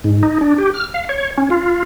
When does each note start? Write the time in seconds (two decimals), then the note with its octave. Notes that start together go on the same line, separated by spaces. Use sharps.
0.04 G#2
0.23 D#4
0.41 D4
0.58 G4
0.74 F6
0.94 F5
1.09 C#5
1.38 C#4
1.50 F4